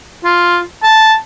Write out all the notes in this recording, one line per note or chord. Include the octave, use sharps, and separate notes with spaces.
F4
A5